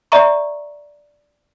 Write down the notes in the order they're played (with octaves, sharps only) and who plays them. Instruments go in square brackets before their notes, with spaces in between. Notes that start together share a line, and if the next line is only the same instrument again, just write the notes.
[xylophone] D5 E5 A#5 C#6